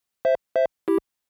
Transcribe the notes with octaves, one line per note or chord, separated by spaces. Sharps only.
C5 E5
C5 E5
E4 G4